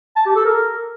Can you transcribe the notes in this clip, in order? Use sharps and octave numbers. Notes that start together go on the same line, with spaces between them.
A5
G4
A4
A#4